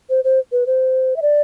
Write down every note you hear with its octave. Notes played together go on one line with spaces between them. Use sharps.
C5
C5
B4
C5
E5
D5